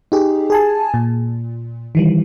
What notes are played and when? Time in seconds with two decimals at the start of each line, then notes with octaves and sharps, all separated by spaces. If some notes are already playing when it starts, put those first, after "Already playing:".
0.12 D#4 G4 G#4
0.50 G#4 G#5 A5
0.94 A#2
1.95 D#3 E3 G3